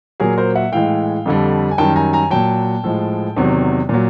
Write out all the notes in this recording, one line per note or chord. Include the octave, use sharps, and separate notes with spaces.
A#2 F#3 G#4 A#4
A#4 C5
E5 F#5
A2 E3 G#3 F5 G5
F2 D3 G3
G#5
F#2 D#3 G3 G5 A5
G#5 A#5
G#5 A#5
A#2 F#3 G5 A5
A2 F3 G#3
E2 C3 D#3 F#3
A#2 F#3